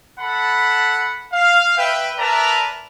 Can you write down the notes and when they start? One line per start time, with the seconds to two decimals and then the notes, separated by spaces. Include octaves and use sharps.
0.20 A4 F#5 A5 B5
1.33 F5
1.77 B4 E5 G5
2.19 A#4 B4 D5 E5 A5 A#5